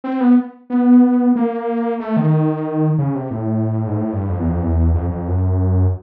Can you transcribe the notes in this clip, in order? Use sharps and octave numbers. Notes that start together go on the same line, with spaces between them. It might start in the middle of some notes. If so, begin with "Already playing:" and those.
C4
B3
B3
A#3
A3
D#3
C#3
C3
A2
G#2
A2
G2
F2
E2
F2
E2
F2
F2
F#2